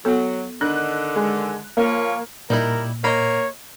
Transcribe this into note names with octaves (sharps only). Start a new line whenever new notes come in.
F#3 B3 A4
D3 D#3 D4 F#6
G#3
F3 A#3 F4 C#5
A#2 G3 D#4 E4 A#4
A#3 C#5 D#5 B5